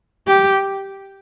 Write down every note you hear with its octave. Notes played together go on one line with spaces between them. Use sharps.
G4